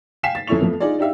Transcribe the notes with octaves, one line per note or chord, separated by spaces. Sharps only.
F5 G5 G#5 B6 C7 E7
A6
F2 A3 C#4 E4 C#6 F7
F2 F3 A3 B3
D4 D#4 F4 G#4 D5
D4 D#4 G4 E5 F5